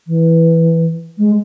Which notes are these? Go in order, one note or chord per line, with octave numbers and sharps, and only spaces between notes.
E3
G#3